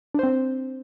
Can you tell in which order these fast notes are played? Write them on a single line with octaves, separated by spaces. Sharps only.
D4 C5 C4